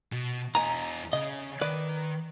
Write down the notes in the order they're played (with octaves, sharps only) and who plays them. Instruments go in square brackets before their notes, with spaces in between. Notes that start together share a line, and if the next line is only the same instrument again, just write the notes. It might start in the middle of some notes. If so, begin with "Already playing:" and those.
[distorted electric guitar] B2
[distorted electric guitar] E2 D#5 [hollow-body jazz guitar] G#5 A#5
[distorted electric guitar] C#3 [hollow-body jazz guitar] D#5
[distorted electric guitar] D#3 [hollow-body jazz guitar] B4 D5